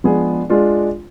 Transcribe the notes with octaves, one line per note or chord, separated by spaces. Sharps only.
F3 G#3 B3 D4 G#4
G#3 D4 F4